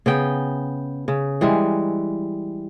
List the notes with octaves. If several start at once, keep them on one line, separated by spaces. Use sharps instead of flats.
C#3 B3 G5
C#3
E3 G3 G#3